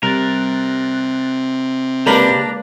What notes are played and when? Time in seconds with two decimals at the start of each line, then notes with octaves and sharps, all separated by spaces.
0.03 C3 G3 A#4 F#6 A6
2.06 C#2 G#3 A#3 D4 G4 A#4 B4 B5